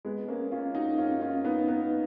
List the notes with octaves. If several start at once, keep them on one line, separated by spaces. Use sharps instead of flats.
G#3 B3
A#3 C#4
C#4 F4
D#4 F#4
C#4 F4
C#4 F4
B3 D#4
B3 D#4